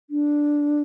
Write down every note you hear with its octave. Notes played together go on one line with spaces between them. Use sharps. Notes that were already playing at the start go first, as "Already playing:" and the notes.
D4